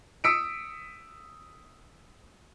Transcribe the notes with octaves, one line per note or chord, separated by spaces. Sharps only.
D#6 E6 B6 C#7 D7